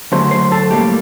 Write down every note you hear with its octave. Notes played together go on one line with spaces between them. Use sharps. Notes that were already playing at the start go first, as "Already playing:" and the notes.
F#2 D3 F#3 A3 C5
C5
A4
A2 G3 A#3 G4